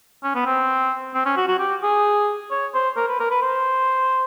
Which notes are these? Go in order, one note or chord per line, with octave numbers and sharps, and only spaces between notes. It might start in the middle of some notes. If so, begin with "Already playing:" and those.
C#4
B3
C4
C4
C#4
F#4
F#4
G4
G#4
C#5
C5
A#4
B4
A#4
B4
C5